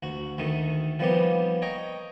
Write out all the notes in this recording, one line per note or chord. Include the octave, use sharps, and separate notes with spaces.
D2 F#4
D2 D#3 A3 D#4
F3 G3 A#3 B3 D#4 G4
C#5 D#5 G5 A#5